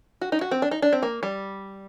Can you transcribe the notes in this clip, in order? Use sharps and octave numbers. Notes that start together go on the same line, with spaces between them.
F#4
D#4
F#4
C4
D4
D#4
D4
C4
A#3
G3